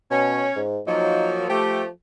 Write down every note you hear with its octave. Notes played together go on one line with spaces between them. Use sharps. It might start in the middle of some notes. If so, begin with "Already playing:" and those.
B2 C#4
G#2
F3 F#3 A#3 D#4
F3 A3 G4